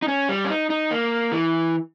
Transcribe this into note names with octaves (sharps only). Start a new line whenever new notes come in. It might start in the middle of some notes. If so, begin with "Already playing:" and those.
D#4
C#4
G3
C#4
D#4
D#4
A#3
E3